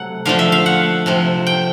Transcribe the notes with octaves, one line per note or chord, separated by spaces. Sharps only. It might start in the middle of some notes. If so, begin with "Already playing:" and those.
Already playing: C3 F#3 A3 F#5
D3 F3 A3 F5
E5
F5
F#5
C3 F3 A3
G5